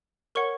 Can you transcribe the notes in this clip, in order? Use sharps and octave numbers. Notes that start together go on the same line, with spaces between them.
A#4 C#5 F#5 C#6